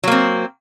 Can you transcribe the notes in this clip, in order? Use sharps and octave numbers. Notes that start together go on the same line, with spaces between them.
F#3 A#3 C4